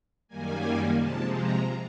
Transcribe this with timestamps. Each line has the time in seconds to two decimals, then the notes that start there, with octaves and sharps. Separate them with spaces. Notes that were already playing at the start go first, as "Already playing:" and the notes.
0.28 F#2 D#3 G3 A#3 G#5
0.97 C3 F3 G#3 A5
1.32 A#5